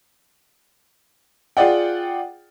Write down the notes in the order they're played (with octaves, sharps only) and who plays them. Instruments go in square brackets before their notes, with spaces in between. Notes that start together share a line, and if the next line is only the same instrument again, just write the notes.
[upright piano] F4 G#4 D5 F#5 G5